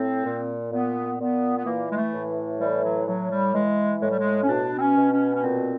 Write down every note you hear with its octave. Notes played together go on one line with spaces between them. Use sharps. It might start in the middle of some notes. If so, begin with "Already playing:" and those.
Already playing: A2 C4
A#2
A#2 B3
A#2 B3
B3
E3 A#3
G#3
A3
A2
E3 G3
F#3
A2 F#3
G3
E3 G#3
A2 G#3
G3
G#3
C#4
B2 D4
C4
C#4
B2
C#4
C#4
A#2 C4